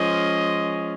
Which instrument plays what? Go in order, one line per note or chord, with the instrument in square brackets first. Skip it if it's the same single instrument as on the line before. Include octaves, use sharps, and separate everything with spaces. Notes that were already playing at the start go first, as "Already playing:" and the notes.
Already playing: [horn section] F3 G#3 C#4 D#5